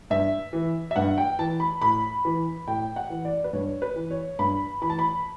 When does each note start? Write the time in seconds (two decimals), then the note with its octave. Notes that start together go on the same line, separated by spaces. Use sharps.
0.10 G2 E5
0.53 E3
0.91 E5
0.96 G2 F#5
1.18 G5
1.39 E3 A5
1.60 B5
1.82 A2 B5
2.25 E3
2.67 A2 G5
2.96 F#5
3.10 E3
3.25 D5
3.44 B4
3.53 G2 C#5
3.82 B4
3.96 E3
4.11 C#5
4.39 G2 B5
4.82 E3 B5
4.90 A5
4.99 B5